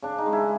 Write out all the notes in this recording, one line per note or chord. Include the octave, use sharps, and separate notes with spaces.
C#3 D4
D#4
G#3
E4